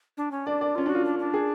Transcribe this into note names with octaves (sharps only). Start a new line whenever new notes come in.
D4
C#4
D4 D5
D5
C#4 F4
D4
F#4
F4
D4
D4
G#4